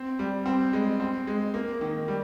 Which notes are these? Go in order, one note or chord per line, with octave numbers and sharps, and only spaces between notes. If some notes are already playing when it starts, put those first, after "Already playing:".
Already playing: C4
G3
C4
G#3
C4
G#3
A#3
D#3
G3